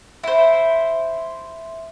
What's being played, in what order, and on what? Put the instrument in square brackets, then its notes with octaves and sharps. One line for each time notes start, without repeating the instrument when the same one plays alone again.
[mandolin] E4 C5